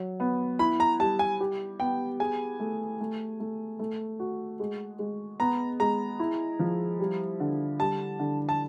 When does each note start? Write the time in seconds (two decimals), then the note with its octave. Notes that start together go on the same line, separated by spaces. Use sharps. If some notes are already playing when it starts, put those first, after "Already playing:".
Already playing: F#3
0.20 B3
0.59 E4 B5
0.80 A#5
1.00 G3 A5
1.19 G#5
1.40 G4
1.80 B3 G5
2.20 G#4 G#5
2.60 A3
3.00 A3
3.40 A3
3.79 A3
4.19 F#4
4.60 G#3
4.99 G#3
5.40 B3 A#5
5.80 G#3 A#5
6.19 E4
6.59 F3
6.99 G3
7.40 D3
7.80 G3 A5
8.19 D3
8.49 A5